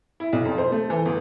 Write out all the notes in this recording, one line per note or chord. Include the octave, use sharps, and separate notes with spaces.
E4
B1
F2
C5
A3
E3
G1